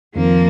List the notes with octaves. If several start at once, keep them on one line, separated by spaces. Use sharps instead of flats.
F2 D#3 F3 A#3 C4